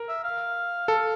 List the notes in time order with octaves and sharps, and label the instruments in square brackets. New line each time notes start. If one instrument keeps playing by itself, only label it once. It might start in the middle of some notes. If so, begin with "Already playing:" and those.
Already playing: [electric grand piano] A#4
[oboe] E5
F5
[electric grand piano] A4